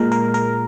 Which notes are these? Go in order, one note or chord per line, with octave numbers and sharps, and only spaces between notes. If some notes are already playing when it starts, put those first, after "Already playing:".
Already playing: A#2 G#3 A#4
A#4
A#4